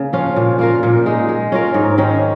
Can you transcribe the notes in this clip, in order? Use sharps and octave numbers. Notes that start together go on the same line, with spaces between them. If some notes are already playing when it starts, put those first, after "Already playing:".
Already playing: C#3 A#3
F3 C#4 F4
A#2
A#3 F4 A#4
A#2
G#3 D#4
G#3
C#4 F4 A#4
G#2
D#3 G#3 C#4